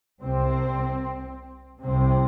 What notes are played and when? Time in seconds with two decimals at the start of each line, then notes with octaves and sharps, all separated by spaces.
0.20 C2 C3 C4
1.81 C2 C3 C4